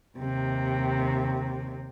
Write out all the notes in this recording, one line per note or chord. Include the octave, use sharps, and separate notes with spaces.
D#2 C3